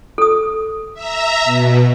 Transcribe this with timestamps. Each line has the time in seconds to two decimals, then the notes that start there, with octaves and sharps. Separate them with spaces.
0.18 A4 D#6
0.94 E5 A#5
1.45 B2